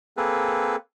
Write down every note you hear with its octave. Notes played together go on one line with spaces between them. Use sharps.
A#3 C4 G#4 A4 B4